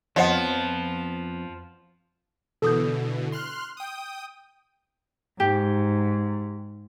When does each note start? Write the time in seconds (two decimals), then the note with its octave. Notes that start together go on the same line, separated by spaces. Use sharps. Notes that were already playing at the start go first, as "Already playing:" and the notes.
0.16 F2 F3 B3 C#5 D#5 F#5
2.62 B2 D3 E3 A4 D#6 G6
3.32 C6 F6 F#6
3.77 G5 D#6
5.40 G#2 G4